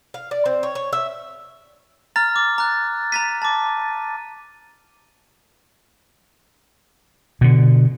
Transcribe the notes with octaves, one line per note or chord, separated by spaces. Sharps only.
F5
D5
C4
C#5
C#5
E5
A#5 F6 A6
D6
A#5 F#6
A#5 A6 B6 D#7
A5 D6
B2 D3